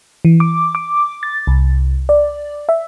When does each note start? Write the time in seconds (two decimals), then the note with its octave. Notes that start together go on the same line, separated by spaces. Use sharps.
0.25 E3
0.40 D6
0.75 D6
1.23 A6
1.47 C2
2.09 D5
2.69 E5